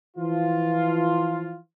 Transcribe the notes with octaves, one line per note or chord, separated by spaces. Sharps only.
E3 F3 F4